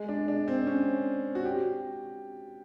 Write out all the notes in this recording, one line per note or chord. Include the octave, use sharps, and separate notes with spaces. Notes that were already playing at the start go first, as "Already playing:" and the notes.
Already playing: G#3
D4
D4
C4
C#4
F#4
G4